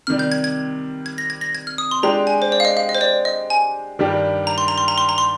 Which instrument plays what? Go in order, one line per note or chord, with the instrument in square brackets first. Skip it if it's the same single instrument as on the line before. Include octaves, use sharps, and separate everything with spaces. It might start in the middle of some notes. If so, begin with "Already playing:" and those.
[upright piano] C3 D#3 G3 [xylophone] F6
[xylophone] G6
G#6
G#6
G#6
A#6
G#6
A#6
G#6
F6
D#6
C6
[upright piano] G#3 D4 G4 [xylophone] A#5
[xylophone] G#5
C5
D5
F5
D#5
F5
D#5
C5
D5
D#5
G#5
[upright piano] G2 D#3 G3 D4 G4
[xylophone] A#5
C6
A#5
C6
A#5
C6
A#5
C6